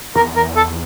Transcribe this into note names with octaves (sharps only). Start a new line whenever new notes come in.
E2 A#4
A#4
A4